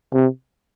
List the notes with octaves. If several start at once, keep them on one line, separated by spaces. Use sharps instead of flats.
C3